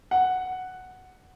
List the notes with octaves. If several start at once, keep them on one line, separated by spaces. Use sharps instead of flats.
F#5